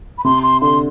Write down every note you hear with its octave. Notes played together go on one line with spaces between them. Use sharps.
B5
C3 C6
C6
D3 C6